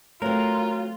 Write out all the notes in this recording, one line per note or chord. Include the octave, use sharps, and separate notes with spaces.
F#3 A3 C4 F4 A#4